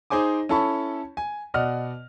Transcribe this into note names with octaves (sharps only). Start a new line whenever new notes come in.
D#4 G#4 C5 G#5 D6
C#4 E4 A4 A5 B5 C#6
G#5
B2 D5 D#5 F#5 F6